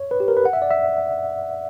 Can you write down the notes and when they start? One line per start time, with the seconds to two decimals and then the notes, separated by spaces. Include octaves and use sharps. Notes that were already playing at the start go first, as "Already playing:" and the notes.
Already playing: C#5
0.11 B4
0.20 G4
0.28 A#4
0.37 B4
0.45 F#5
0.53 E5
0.62 D5
0.71 E5